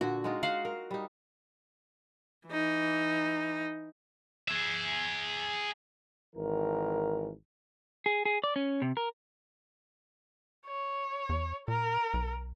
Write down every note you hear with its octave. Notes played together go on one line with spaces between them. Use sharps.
A#2 D3 F#4
G#3 D#4 F4
F#4 F5 F#5
A#4
G3 D#4
E3 D#4
G#4 E5
G#1 E3 A#4
G#4
G#4
D5
C#4
C3
A#4
C#5
E2
A#2 A#4
B1